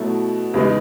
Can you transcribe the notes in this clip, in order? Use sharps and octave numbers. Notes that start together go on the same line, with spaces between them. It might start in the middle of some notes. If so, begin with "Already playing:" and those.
Already playing: B2 F#3 A3 E4
E2 C#3 G#3 D#4